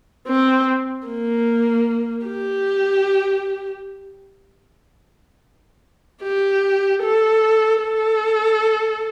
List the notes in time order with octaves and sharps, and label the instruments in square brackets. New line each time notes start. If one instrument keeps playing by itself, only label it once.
[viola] C4
A#3
G4
G4
A4
A4